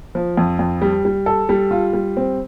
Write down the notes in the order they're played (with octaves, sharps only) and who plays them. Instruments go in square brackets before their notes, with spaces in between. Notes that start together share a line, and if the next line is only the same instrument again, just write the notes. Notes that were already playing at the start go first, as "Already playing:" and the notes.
[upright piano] F3
F2
F2
G3
G3
A4
G3
F4
G3
C4